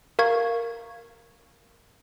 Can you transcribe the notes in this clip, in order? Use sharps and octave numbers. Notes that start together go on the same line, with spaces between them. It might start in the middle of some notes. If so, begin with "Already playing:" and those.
A#4 F5 C#6 G#6